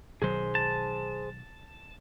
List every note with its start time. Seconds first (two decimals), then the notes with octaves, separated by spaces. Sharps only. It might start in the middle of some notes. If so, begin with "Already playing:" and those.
0.22 B1 D#3 F#3 G#4 C5
0.55 A5